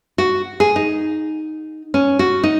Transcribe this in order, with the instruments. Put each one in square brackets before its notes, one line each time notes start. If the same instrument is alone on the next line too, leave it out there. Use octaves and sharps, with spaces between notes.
[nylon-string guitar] F#4
G#4
D#4
C#4
F#4
D#4